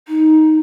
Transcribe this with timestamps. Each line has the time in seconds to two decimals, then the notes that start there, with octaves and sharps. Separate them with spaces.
0.08 D#4